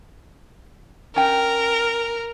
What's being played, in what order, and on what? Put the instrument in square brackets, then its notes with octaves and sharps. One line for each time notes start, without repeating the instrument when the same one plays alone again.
[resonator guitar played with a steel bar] C#4 G5 [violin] A#4